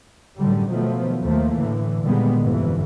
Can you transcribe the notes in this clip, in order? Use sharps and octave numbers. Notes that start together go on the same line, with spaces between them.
F#2 A2 D3 G3
B2 D#3 F3 F#3 A3 B3
D#2 F3 A3 A#3
A2 D3 E3
A#2 D3 D#3 G3 G#3 B3
G1 F2 E3